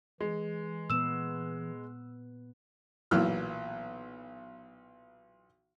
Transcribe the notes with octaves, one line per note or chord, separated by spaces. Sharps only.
E3 G#3
A#2 B3 B4 E6 E7
B1 A#2 E3 F#3 E6 F6